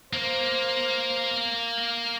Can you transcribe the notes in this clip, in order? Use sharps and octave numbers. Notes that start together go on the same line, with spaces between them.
A#3 C5